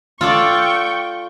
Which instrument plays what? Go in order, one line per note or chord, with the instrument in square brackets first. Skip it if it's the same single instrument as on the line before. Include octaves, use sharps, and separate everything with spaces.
[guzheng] F4 A4 D5 [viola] G5 C#6